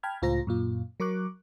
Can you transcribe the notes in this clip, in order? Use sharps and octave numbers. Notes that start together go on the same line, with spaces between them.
G5 A5 B5 F6 G#6
C#2 A2 F4 C5 A#5 A#6
F#2 A#2 F4
F#3 A#4 C#6 D6 F#6